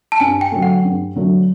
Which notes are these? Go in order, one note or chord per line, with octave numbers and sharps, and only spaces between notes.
A5
G2 G#5
G5
D3 F#3 A3
F#5
G2
D3 F#3 A3